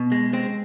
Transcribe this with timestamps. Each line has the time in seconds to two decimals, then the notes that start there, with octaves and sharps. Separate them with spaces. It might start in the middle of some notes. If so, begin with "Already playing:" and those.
Already playing: B2
0.12 G#3
0.33 G#3 C4